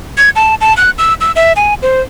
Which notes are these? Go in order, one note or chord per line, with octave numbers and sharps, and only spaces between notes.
G#6
A5
A5
F#6
E6
E6
E5
G#5
C5